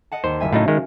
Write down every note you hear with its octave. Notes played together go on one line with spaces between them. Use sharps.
D#5 F#5 A5
D#2 C5
F#1 E5 G#5
A2 A3 C#4 D#4 F#4 F5
D#3 G#3